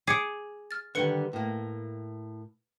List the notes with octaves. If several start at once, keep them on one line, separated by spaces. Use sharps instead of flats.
G#4 D6 C#7 D7
F6 A6
D3 D#3 G3 B4 C#7 G7
A2 A#3